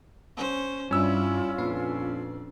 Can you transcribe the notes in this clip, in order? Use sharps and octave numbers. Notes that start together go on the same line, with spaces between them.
C#4 C5
G2 G3 C#4 D4 E4 F4 E6
F2 A#2 D4 B4 C7